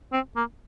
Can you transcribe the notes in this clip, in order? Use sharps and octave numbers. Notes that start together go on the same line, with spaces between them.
C4
A#3